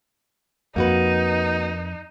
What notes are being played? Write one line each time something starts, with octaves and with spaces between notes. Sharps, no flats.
F2 A#3 D#4 F#4 B4